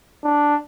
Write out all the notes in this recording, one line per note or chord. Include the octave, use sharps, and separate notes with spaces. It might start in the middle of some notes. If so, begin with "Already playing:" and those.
D4